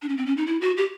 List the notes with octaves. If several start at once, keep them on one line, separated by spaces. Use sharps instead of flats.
D4
C#4
C4
C#4
D#4
E4
F#4
G4